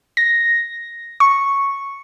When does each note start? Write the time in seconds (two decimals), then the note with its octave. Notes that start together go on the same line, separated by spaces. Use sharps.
0.17 A#6
1.20 C#6